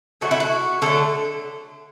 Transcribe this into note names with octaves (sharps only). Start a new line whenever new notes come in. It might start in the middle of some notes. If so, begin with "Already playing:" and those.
D3 F#3 A3 F#4
E4
F#4
D3 F#3 A3 A4